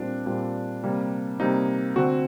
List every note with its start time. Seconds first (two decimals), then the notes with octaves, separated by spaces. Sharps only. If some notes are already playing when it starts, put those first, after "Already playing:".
Already playing: A#2 G3 C4 D4
0.26 A#2 G3 C4
0.83 C3 G3 A#3
1.40 C3 G3 A#3 D#4
1.96 D3 A3 C4 F#4